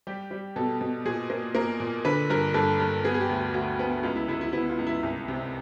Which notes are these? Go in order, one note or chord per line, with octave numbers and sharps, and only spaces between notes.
G3 G4
G3
B2 A4
B2
A#2 G#4
A#3
A#3 A#4
A#2
D3 B4
G2 A#4
G2 A4
G2
B3 G#4
G#4
G4
D2
F#4
D2 F#4
B3
C#2 F4
E4
C#2 E4
E4
B3 E4
F4
C#2
E4
C2
C3